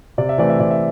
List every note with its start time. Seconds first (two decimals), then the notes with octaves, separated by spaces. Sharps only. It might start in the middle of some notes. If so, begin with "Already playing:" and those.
0.18 C3 D5
0.29 E5
0.38 E3 A3 C4 D5
0.50 E5
0.60 C3 D5
0.71 E5